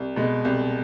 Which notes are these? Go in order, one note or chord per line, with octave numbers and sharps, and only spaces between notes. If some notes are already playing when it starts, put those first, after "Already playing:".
Already playing: C2
B2 G#3
C2